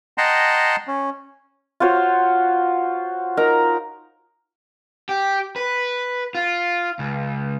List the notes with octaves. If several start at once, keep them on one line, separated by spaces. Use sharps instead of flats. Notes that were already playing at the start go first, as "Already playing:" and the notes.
D#5 F#5 G5 A5 A#5 C6
C#4
F4 F#4 C5 C#5
D#4 A#4 A#5
G4
B4
F4
C#2